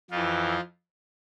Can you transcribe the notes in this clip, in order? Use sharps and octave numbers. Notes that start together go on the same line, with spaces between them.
F2 E3 F3 F4